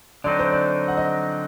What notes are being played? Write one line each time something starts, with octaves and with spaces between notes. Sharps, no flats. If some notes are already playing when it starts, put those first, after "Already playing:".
D3 F#3 C4 D#4 D5
C5
D5
F#5
D#5